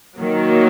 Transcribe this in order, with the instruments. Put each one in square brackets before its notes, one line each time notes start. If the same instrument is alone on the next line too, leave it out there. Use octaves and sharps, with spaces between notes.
[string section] D#3 F#3 A#3